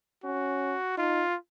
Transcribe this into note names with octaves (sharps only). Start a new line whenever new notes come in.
C#4 F#4
D#4 F4